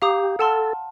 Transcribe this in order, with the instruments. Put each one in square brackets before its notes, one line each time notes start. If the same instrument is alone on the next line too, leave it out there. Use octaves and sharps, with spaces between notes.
[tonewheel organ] G4 [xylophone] F5 A#5 D#6
[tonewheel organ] A4 [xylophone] F#5 A5 C6 F6